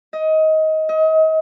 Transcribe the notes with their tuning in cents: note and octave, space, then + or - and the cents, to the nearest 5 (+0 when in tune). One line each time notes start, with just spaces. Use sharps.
D#5 +20
D#5 +35